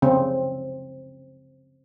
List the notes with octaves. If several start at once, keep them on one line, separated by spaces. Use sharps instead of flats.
C#3 C4